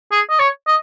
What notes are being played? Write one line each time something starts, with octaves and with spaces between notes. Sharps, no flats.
G#4
D#5
C#5
D#5